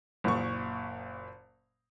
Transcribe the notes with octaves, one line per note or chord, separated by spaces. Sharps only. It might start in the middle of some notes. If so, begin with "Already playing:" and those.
F#1 A#2 C#6